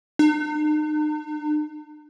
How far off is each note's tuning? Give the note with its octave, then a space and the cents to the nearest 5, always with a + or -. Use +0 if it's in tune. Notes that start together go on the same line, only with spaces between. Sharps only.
D#4 -45